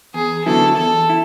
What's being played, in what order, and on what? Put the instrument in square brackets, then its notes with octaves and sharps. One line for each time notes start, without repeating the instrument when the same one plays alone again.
[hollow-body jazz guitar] E2 [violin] G#4
[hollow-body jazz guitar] D3 F#3 B3 E4 [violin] A4
[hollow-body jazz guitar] E2 [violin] A4
[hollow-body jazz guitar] E4